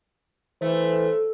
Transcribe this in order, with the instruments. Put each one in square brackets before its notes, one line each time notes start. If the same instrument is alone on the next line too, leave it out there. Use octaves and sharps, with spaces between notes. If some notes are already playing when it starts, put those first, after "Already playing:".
[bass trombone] E3 [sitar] A3 [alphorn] C5